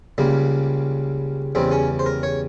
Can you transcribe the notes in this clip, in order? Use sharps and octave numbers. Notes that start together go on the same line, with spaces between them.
C#2 C#3 G3 A#3
E2 C#3 G3 C4
C#4
C5
A#4
C#5